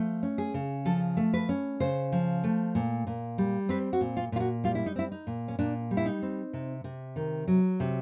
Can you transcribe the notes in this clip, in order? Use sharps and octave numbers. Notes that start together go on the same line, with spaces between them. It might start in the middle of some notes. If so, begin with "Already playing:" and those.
Already playing: F3 A3
C#4
G#4
C#3
F3 A4
A3
B4
C#4
C#3 C5
F3
A3
A#2
A#2
G3
C4 B4
F#4
A#2
F4
A#2 F4
F#4
G3 F4
E4
D#4
C4 E4
D#4
A#2
C#4
A#2 D4
G3
E4
D#4
C4
C3
C3
D#3
F#3
C3